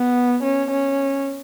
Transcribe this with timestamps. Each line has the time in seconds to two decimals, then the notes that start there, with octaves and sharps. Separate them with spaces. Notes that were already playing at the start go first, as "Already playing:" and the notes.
Already playing: B3
0.43 C#4
0.71 C#4